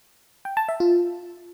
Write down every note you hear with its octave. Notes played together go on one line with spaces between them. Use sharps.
G5
A5
E5
F4